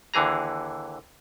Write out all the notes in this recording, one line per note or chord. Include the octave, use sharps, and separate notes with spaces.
D#2 D3 E3 G#4 A#5